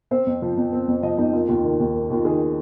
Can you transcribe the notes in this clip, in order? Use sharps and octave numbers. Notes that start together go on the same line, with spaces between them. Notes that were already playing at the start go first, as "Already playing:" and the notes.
C4 C5
F2
F3
F2
C4
F2
F3 D#5
F2 D#4
A#3 F4
D#2 F4
D#3
D#2
A#3
D#2 F4
D#3 G#4